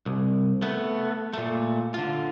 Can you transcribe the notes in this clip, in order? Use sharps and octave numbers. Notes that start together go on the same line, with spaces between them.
C2
A3 B3
A#2 A3
D3 F4